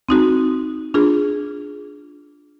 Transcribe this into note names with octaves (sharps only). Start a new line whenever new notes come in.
C4 D#4 F#4
D4 F4 G#4